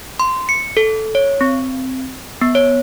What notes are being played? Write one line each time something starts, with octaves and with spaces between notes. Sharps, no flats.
C6
C#7
A4
C#5
C4
B3
C#5